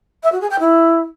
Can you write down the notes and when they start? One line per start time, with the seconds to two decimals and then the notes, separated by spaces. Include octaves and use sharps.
0.23 E5
0.32 F#4
0.41 G#4
0.50 G5
0.59 E4